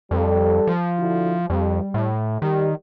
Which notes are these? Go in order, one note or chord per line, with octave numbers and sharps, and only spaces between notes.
F2 G3 A4
F3
D3 E4 F#4
F2 G3
A2
D#3 G3